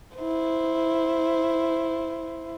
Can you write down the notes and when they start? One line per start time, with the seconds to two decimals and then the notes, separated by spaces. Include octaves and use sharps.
0.18 E4 C5